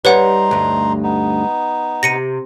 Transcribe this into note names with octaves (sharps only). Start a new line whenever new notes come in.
G3 D#4 B4 C#5 F#5 A#5 C6
D2 G2
B3 D#4
C3 A#6 C#7 D#7